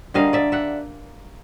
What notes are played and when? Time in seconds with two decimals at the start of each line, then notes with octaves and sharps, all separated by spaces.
0.14 D3 G3 A#3 D#5 F5
0.33 D5 E5
0.52 E5 F#5